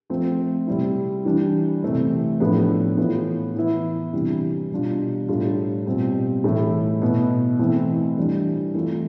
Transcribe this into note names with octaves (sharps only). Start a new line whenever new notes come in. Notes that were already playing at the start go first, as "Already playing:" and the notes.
F3 A3 C4 F4
C3 G3 C4 E4
E3 G3 D4
C3 E3 A3 C4
A2 F3 B3 D4
A2 E3 B3 F4
E3 B3 E4
C3 E3 G3 D4
B2 G3 D4 F4
A2 G3 D4 F4
B2 G3 C4 F4
A2 E3 A3 E4
B2 B3 E4
E3 A3 C4 E4
E3 G3 D4
E3 A3 C4 F4